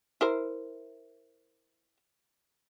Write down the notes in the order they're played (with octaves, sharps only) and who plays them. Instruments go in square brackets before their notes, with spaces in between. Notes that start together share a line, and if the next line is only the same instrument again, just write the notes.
[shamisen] E4 A#4 C5